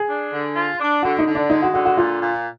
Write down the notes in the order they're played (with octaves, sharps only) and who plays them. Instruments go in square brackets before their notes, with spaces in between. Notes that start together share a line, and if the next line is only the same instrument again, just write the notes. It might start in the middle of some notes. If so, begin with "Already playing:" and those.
Already playing: [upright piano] G#4
[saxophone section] D4
D3
F4
D4
[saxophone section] D3 [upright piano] F#4
[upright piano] D#4
[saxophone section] D3
[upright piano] D4
[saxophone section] G#3 [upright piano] D#4
[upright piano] F#4
[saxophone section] D3 [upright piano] F#4
[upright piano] F#4
[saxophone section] A#2 [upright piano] F4
[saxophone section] A#2